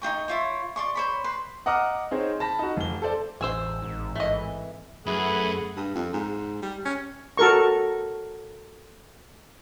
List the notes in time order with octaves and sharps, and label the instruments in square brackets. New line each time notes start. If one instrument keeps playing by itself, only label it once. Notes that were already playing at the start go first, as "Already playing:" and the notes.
[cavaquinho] D#4 F4 G5 C#6
E4 F4 C#5
D5 C6 C#6
C5 C#5 B5
B4 C6
[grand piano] D#5 F#5 A#5 D6 D#6 F6
C4 D#4 G#4 C5 C#5
A5 B5 A#6
D#4 F#4
F1 G7
A4 C5 D5
[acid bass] E1 [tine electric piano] A1 E6 [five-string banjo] G#4 C5
[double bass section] G#1 [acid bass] G#2
[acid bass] E3 [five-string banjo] A3 D#5
[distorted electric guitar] F#2 [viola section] A3 F#5 [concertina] E4 B4 [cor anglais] G#4
[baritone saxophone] G2
F2
G#2
G3
C#4
[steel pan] F#4 A4 A#4 C#6